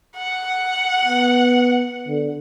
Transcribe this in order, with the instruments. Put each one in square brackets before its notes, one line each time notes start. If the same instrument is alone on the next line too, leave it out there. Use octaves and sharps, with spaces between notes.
[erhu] F#5
[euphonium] B3
D3